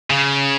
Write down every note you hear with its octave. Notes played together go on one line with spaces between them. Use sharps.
C#3